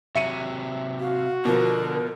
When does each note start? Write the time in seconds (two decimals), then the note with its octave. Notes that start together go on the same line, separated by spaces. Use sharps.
0.15 C3 F#3 E5 C#7 D#7
1.00 F#4 F5
1.45 B2 D3 F3 A#4